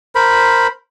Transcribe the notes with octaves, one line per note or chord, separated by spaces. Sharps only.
A#4 C5 B5